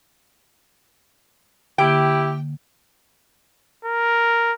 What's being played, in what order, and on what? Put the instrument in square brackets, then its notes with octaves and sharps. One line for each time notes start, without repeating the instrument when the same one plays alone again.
[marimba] D3 A#3 [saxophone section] E4 G4 [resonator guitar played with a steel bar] G5
[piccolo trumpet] A#4